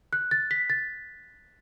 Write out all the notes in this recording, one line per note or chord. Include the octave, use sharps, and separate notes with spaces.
F#6
A6
B6
A6